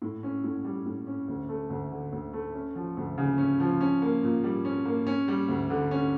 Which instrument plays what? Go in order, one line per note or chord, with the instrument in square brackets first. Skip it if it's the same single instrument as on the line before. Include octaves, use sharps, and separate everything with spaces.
[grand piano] A2
C#4
A2
G3
A2
C#4
D2
A3
D2
D3
D2
A3
C#4
F3
D2
C#3
C#4
F3
C#4
A#3
A#2
G3
C#4
A#3
C#4
G3
D2
D3
C#4